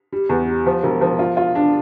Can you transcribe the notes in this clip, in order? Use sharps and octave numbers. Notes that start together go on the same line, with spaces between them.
G3
E2
G3
F3
E1
F3
F4
F4
D4